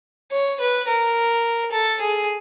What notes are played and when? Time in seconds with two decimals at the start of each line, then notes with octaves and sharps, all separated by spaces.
0.31 C#5
0.60 B4
0.88 A#4
1.72 A4
2.01 G#4